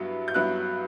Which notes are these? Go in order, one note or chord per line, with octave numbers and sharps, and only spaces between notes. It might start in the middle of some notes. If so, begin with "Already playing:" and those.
Already playing: G2 F#3 B3 E4
G6
G2 F#3 B3 E4 F#6